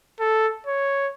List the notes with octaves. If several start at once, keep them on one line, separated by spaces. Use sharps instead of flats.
A4
C#5